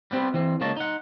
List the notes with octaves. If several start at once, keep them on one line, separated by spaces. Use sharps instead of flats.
G3 B3 C4 G4
E3 C4
C#2 A#3 C#5 D#5 A5
D#4 F#5